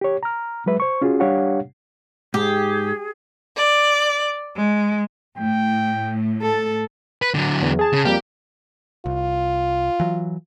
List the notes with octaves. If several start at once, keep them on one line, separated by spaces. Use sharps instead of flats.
G4 C#5
A#5 F6
F#3 G#3 B4 E5
C5 C#6
C#4 F4 F#4 G#4
G3 D4 G4 C#5 F5 F#5
G#2 G4 G#4
D5
G#3
A2 G5
A4 A5
B4
D3 F#3
E2
G#4 A5
C#3
F2 G3 A#3 G4
C2 F4
E3 F#3